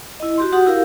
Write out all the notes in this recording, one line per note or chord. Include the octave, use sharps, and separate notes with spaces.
E4 D#5
F#4 G4 C6
F#4 G4 F#5 D#6
E4 G4 A#4 F5